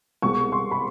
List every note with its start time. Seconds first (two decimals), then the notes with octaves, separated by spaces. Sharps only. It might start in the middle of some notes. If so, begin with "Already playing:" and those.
0.22 C2 B2 G#3 C#6
0.52 C6
0.71 B5